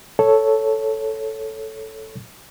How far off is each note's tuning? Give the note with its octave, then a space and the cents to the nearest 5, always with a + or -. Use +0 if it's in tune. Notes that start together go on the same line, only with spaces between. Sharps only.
A4 +0 C#5 +0